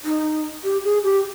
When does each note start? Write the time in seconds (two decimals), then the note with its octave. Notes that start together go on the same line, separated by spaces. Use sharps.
0.04 D#4
0.64 G4
0.84 G#4
1.04 G4